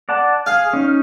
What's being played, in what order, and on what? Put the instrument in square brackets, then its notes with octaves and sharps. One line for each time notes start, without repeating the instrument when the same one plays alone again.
[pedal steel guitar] D5 F#5 A5
[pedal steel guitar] G#4 [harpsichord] F5
[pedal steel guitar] C#4 D#4